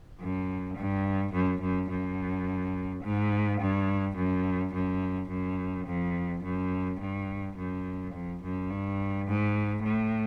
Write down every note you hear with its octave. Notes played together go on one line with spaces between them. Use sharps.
F#2
G2
F#2
F#2
F#2
G#2
G2
F#2
F#2
F#2
F2
F#2
G2
F#2
F2
F#2
G2
G#2
A2